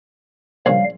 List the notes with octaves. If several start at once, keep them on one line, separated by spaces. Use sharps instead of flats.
A#1 C#3 G3 F5